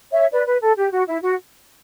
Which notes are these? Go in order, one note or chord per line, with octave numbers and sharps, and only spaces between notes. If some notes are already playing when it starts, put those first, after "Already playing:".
C#5 E5
B4 D5
B4
A4
G4
F#4
E4
F#4